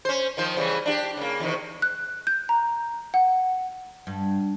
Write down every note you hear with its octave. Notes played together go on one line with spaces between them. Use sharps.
C#4 C5
D#3 F3 C5
C#3 E3 G3
D4 E4 G4
C#3 A#3
E2 C3 D#3
F#6
G6
A#5
F#5
G2